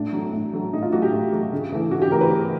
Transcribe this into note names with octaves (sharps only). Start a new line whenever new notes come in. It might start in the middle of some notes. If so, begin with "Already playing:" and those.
Already playing: A2 D4
F#3 A3
A2
F#3 A3
A2 D#4
F4
F#3 A3 F#4
G4
A2
F#3 A3
C#3
E3 A3
C#3 F#4
G4
E3 A3 A#4
B4
C#3